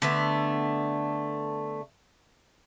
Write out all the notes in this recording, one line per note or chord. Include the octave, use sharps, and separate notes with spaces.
D3 A3 B3